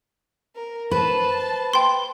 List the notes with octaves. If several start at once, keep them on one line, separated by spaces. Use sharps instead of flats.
A#4
B4 C5 A5
G5 C6